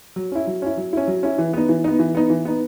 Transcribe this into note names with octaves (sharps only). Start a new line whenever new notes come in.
F#3
C#4 E4
F#3
C#4 E4
F#3
C#4 E4
F#3
C#4 E4
E3
B3 D#4
E3
B3 D#4
E3
B3 D#4
E3
B3 D#4